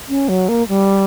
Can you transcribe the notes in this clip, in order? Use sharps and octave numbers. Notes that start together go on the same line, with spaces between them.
C#4
F#3
A#3
G3